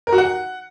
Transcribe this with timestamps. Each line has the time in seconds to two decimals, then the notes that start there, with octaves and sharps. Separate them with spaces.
0.07 A#4
0.12 F#4
0.18 F#5